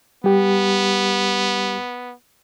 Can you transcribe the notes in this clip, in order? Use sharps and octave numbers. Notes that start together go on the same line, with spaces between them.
G3 B3 G4